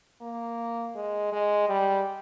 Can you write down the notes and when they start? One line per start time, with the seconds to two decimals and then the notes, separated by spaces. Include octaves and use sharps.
0.22 A#3
0.95 G#3
1.32 G#3
1.69 G3